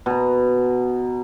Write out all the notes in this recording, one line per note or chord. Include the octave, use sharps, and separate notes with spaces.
B2 A#5